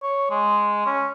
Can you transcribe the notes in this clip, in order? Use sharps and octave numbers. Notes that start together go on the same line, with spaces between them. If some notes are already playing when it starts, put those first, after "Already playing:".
C#5
G#3
C#4